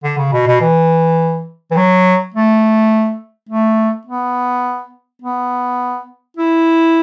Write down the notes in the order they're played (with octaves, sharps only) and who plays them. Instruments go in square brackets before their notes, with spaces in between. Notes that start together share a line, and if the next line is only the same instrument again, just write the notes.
[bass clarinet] D3
C#3
B2
B2
E3
E3
F#3
A3
A3
B3
B3
E4